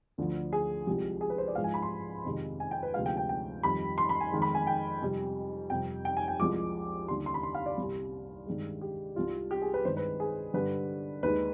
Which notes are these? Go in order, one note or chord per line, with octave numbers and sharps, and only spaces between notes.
D2 D3 F3
G#4
C2 C3 F3 G#3 G4
G#4
B4
C5
D5
G#2 F3 G#3 F5
G#5
B5
C6
F2 C3 D#3 G#3
G#5
G5
B4
D2 C3 F3 G#3 F5
G5
G5
G5
F2 D#3 G3 B5
C6
B5
G#5
F2 D#3 G#3
B5
G#5
G5
F2 C3 G3
F2 C3 G3 G5
G5
G#5
G5
C2 C3 F3 G#3 D6
D#2 D3 G3 C6
C6
B5
C6
F5
D5
C2 C3 G3
G2 D#3 G#3
G4
C2 C3 G3 F4
G4
G#4
B4
G2 D#3 G#3 C5
B4
G#4
G2 D3 G3 B4
D#2 D#3 G#3 B4